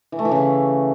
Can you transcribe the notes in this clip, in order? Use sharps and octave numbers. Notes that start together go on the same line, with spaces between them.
E3
A3
E3
C#3